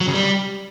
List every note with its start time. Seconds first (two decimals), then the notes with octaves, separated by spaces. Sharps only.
0.01 F#3
0.07 C#3
0.14 G3